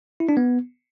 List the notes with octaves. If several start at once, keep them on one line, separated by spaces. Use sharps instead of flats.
E4
D4
B3